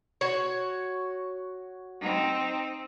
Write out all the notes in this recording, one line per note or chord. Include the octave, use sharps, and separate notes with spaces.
F#4 C#5
C4 D#4